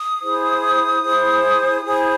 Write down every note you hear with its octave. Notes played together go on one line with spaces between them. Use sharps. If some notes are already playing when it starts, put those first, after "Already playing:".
Already playing: D#6
E4 G#4 C5
E4 G#4 C5
E4 G#4 C5